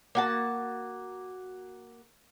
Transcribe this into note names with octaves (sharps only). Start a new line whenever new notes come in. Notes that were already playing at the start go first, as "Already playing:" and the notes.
A#3 F#4 A5